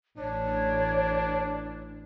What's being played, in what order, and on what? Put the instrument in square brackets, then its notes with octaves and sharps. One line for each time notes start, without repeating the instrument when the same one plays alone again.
[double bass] A1 [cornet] D4 [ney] C#5